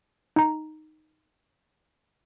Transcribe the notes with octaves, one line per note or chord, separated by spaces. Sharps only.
D#4 A#5